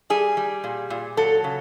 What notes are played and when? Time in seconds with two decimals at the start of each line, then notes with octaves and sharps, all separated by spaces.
0.10 G3 G#4
0.37 G3
0.64 A#2
0.90 A#2
1.17 F#3 A4
1.44 C#3